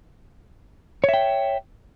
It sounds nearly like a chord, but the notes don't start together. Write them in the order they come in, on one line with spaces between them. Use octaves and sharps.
C#5 E5 G5